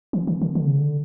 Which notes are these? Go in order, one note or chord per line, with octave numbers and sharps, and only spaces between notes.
E3
D#3
D3
D3
C#3
D3